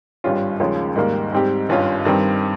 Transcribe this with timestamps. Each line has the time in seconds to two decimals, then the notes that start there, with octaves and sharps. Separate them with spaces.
0.24 G#1 G2 G3 C#4 F4
0.60 D#2 C#3 F3 G#3 C#4
0.96 G#2 D#3 G3 A#3
1.32 G#2 G3 C4 G4
1.69 G#1 G2 G3 C#4 F4
2.05 G2 D#3 G3 C4